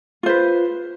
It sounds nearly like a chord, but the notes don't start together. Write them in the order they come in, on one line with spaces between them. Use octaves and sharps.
F4 C5 B4